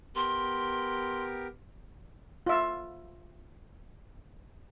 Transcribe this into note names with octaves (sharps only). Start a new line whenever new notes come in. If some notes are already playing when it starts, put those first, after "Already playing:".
B3 G4 A#4 C6
F4 E5